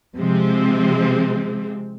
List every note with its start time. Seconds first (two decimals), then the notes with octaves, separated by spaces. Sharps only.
0.17 C3 F3 G#3 C4